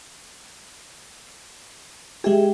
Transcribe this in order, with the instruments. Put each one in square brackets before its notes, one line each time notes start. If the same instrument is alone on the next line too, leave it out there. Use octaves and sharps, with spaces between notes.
[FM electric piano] G#3 G4 [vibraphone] G#4 E5 G5